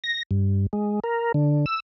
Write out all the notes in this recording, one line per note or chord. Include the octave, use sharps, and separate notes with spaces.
A#6
G2
G#3
A#4
D3
E6